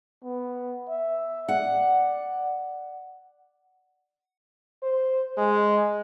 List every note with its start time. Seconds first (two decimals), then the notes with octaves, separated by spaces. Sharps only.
0.24 B3
0.89 E5
1.49 D5 F#5
4.83 C5
5.37 G#3